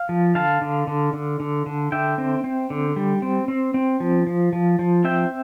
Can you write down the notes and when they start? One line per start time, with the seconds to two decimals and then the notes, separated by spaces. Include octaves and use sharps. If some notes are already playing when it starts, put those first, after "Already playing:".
Already playing: F5
0.09 F3
0.35 D3 F5 A5
0.62 D3
0.87 D3
1.13 D3
1.40 D3
1.66 D3
1.92 D3 E5 G5
2.18 C4
2.44 C4
2.70 D3
2.96 G3
3.22 C4
3.48 C4
3.74 C4
4.00 F3
4.27 F3
4.53 F3
4.79 F3
5.04 C4 E5 G5